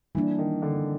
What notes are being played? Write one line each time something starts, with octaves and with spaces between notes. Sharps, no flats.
E3 G3 A#3 D4
D#3
D3